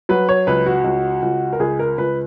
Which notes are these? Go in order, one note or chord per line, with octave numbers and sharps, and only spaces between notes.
F#3 B4
C#5
C#2 B4
F#4
C#2
C#2
A#4
C#2 G#4
A#4
C#2 B4